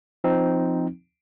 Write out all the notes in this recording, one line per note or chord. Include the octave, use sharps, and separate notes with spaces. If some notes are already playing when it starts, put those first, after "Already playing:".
F3 C4 D#4